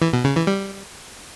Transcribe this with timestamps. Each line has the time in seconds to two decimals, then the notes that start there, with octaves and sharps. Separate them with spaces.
0.02 E3
0.13 B2
0.24 C#3
0.36 E3
0.47 G3